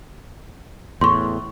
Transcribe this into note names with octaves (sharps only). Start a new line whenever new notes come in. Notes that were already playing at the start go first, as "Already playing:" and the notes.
E2 A2 C6 C#6